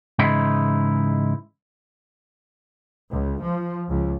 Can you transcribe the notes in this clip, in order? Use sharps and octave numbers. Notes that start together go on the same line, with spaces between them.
G#2 C#3 E3 G#3 D#4 E4
C#2
F3
C#2